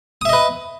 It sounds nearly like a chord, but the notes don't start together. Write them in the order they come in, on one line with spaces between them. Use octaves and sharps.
D#6 E5 D#5 B4